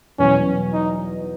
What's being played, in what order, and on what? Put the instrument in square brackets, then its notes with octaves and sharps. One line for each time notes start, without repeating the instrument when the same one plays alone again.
[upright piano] E2 B2 F#3 [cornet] C#4
[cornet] D#4